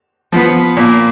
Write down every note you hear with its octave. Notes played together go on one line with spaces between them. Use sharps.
F3 B3
A#2 A#3